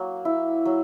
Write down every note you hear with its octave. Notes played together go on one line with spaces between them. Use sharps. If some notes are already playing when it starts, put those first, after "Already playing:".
Already playing: F#3 A#3
E4
F#3